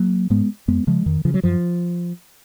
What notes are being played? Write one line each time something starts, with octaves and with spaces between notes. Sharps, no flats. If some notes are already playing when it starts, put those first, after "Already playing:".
Already playing: F#3 A#3
G#2 G#3 B3
F2 G#3 B3
C#3 F3 G#3
F2 D#3
C#3 F3
F#3
F#2 F3